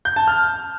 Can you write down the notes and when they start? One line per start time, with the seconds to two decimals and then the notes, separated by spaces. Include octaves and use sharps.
0.05 G6
0.16 A5
0.28 F6